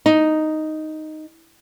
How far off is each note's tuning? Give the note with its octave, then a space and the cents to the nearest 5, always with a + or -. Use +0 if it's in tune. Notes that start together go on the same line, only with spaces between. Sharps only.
D#4 +0